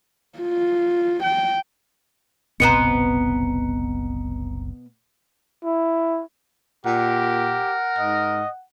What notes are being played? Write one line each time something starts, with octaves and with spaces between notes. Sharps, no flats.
F4
G5
F#1 C2 B2 B3 C4 C5 A#5 C#7
E4
A#2 G4 A#4 F#5
G#2 D#5